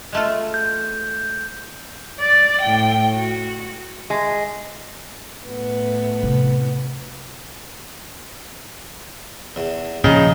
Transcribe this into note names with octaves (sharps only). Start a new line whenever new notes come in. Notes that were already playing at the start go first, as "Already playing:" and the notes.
G#3 A3 F4
G6
D5
A2 G5
F#4
G#3
A2 B3
C3
E2
A#2 C#3 F3 D#4 G#4 G5